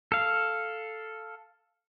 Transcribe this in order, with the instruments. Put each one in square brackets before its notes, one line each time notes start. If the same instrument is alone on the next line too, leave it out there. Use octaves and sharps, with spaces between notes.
[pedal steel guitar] A4 F5